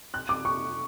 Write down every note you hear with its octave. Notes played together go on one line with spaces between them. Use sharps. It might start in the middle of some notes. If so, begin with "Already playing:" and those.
F#6
D6
C#6